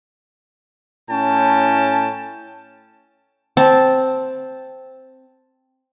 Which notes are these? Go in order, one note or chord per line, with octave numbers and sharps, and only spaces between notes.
A2 C#4 G5 A5
C4 A5